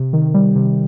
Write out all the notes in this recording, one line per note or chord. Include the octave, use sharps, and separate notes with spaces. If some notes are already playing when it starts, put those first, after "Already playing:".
Already playing: C3
D#3
G3
C3